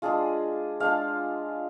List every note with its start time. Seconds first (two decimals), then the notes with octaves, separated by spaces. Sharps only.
0.02 G#3 D4 F4 G#4
0.80 G#3 D4 F4 F5